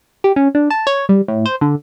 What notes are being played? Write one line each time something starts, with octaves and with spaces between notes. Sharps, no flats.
G4
C#4
D4
A5
C#5
G3
A2
C5
D3